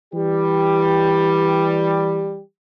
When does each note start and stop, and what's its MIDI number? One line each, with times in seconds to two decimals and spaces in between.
0.14 2.39 52
0.14 2.39 55
0.14 2.39 67